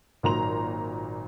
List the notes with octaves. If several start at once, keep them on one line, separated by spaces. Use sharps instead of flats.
G#1 A#2 F#3 A#5 C6 F7